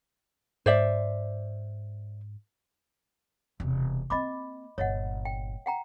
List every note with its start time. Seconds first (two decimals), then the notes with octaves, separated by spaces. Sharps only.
0.66 G#2 C5 D5 E5
3.60 E1 C3
4.10 A#3 C4 D#5 B5 D6
4.78 G1 A#2 C#5 D#5 F#5
5.25 G5
5.66 F#5 G5 A#5